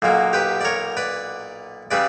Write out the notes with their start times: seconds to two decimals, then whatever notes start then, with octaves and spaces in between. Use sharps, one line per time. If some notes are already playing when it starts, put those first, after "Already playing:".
0.02 B1 A#2 F#3 A#3
0.33 G4 B4
0.61 D5
0.65 A#4 C#5
0.97 B4 D5
1.91 C#3 G3 B4 D5